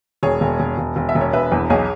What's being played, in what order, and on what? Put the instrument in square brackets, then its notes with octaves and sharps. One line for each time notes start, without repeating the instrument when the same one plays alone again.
[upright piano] E1 G#4 C#5
E1
E1
E1
E1
E5
E1
C#5
E1 B4 E5
E2
B1 G#4 C#5